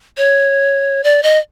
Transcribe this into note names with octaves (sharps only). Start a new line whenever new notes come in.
C#5
D5
D#5